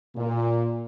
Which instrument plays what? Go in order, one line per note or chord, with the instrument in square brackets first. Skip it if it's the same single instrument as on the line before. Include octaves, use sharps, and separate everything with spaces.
[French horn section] A#2